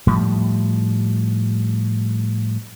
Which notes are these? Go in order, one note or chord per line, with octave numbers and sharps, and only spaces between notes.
A2 F3 G3